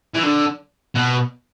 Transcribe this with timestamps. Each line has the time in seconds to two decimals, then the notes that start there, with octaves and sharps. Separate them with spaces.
0.14 E3
0.23 D3
0.95 B2